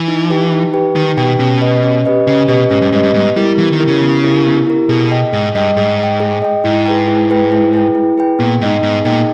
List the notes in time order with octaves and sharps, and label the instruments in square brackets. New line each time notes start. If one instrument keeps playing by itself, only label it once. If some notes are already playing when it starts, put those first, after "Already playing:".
Already playing: [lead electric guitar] E3
[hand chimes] D#4
G4 B4 G5
D#4
G4 B4 G5
[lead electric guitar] D#3 [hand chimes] D#4
[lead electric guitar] B2 [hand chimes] G4 B4 G5
[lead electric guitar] B2 [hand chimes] C#4
[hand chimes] G4 B4 D#5
C#4
G4 B4 D#5
[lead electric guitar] C#3 [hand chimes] C#4
[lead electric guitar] B2 [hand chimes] G4 B4 D#5
[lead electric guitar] G#2 [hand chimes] C#4
[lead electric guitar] G2
[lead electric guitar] G#2 [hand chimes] G4 B4 D#5
[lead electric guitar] G2
[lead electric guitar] G#2 [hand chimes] B3
[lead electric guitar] G3 [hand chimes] E4 G4 A#4
[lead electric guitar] E3 [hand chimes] B3
[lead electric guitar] D#3
[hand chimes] E4 G4 A#4
[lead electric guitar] C#3
[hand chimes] B3
E4 G4 A#4
B3
E4 G4 A#4
[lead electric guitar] B2 [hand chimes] G#4
[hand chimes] D#5 G5
[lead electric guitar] G#2 [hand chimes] G#4
[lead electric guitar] G2 [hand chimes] D#5 G5
[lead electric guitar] G#2 [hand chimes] G#4
[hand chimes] D#5 G5
G#4
D#5 G5
[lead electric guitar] G#2 [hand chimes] E4
[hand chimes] G#4 B4 G5
E4
G#4 B4 G5
E4
G#4 B4 G5
E4
G#4 B4 G5
[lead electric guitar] A#2 [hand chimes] B3
[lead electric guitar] G#2 [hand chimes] D#4 G#4 D#5 G5
[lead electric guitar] G#2 [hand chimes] B3
[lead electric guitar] A#2 [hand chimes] D#4 G#4 D#5 G5